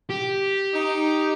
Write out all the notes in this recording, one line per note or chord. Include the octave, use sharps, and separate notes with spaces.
G4
D#4